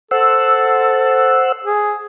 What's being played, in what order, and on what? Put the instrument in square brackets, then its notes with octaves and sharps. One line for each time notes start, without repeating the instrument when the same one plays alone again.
[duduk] A4 [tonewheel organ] C5 F#5 E6
[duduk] G#4